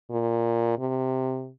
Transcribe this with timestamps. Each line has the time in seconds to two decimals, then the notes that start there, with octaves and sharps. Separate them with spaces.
0.11 A#2
0.79 C3